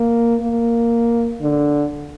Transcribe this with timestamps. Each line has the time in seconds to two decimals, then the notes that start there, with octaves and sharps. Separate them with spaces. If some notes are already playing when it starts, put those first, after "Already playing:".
Already playing: A#3
0.41 A#3
1.41 D3